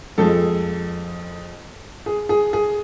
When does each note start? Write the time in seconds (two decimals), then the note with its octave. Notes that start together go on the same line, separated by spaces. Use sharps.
0.18 F2 F3 G#3 A4
2.06 G#4
2.29 G#4
2.53 G#4